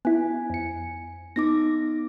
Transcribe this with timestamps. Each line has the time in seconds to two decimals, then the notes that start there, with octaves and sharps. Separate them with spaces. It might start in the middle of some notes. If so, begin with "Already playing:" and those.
0.05 B3 E4 G#5
0.50 F2 C#7
1.36 B3 D#4 D6 A#6